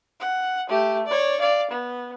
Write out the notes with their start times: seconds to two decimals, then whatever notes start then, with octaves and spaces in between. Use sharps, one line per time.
0.20 F#5
0.69 A3 G4
1.06 C#5 D5
1.40 D5 F5
1.71 B3